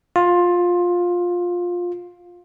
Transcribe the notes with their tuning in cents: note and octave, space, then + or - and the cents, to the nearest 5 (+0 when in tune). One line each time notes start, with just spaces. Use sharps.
F4 +15